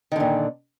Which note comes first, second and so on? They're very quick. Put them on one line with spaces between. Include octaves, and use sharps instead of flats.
D#3 D3 A#2